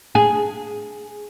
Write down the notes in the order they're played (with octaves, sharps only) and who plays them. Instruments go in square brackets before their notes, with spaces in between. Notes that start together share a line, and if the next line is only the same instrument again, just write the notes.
[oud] G#4